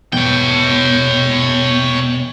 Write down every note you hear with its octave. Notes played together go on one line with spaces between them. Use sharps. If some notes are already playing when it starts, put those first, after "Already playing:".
E2 B2 C#5 G5